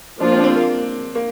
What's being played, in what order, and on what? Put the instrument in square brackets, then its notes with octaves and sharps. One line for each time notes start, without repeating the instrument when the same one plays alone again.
[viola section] F3 A#3 F4 [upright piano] D4
[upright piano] C4
D4
C4
A#3
A#3